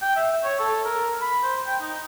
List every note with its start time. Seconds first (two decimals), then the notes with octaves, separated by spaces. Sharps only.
0.01 G5
0.16 E5
0.44 C#5
0.59 A4
0.85 A#4
1.22 B5
1.43 C5
1.66 G5
1.81 D#4